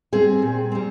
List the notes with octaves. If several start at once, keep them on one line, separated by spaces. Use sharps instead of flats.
G3 C4 G#4
A#2
G3 C4